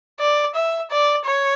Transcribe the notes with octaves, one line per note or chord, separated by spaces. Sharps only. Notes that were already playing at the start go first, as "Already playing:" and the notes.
D5
E5
D5
C#5